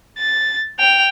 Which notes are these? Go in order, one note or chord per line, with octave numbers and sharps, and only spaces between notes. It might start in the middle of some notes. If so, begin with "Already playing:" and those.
A6
G5 F7